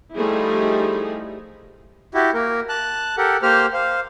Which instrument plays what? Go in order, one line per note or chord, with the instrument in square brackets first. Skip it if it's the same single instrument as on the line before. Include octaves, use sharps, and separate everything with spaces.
[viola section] F3 G3 A3 D#4 E4 G#4
[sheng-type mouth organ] E4 F#4 G4
A#3 A#4
A5 F#6
G4 A4 A#4 F#5
A#3 G4 C5 F6
C5 F5